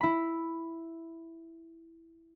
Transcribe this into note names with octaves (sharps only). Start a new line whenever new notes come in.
E4 B5